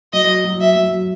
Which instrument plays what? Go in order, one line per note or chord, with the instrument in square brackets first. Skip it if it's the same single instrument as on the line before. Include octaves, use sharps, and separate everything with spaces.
[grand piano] F#3 [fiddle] D#5
[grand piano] F#3
[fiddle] E5
[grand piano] F#3